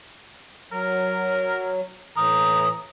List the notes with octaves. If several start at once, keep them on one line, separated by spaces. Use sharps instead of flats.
F#3 A#4
A2 E3 A#5 D#6